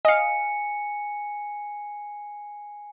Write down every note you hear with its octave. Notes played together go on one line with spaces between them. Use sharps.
D#5 F5 G#5 C#7